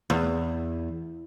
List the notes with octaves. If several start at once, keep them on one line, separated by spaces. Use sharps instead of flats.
E2